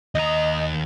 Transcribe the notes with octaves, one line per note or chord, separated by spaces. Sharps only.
D#2 D#5 A#5